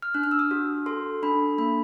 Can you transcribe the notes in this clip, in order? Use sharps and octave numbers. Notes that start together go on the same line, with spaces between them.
F6
D4 F#6
F6
E6
D#6
F#4
A4 C6
D4 B5
A#3 B5